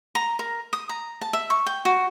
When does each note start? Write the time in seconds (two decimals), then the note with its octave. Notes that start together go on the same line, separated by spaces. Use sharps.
0.15 A#5
0.39 A#4
0.73 D#6
0.89 A#5
1.21 A5
1.33 E5
1.50 C#6
1.66 G5
1.85 F#4